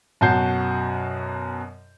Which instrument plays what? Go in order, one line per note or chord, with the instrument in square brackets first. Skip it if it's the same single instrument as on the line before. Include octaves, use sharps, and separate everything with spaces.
[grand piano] F#2 B2 F#4 A5 G6 C7